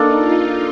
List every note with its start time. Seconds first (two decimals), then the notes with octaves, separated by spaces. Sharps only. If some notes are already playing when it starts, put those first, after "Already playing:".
Already playing: A#3 D4 D#4 A4 D5
0.16 F4